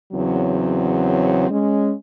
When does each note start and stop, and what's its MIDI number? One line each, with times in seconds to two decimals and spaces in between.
0.13 1.50 40
0.13 1.50 49
0.13 1.50 54
0.13 1.50 60
1.51 1.93 56
1.51 1.93 61